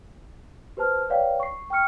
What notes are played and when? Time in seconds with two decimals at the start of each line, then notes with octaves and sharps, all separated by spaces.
0.77 G4 B4 C5 A5 F6
1.09 B4 C#5 D5 F5 G5
1.40 C#6 C7
1.70 G5 C#6 F6 C#7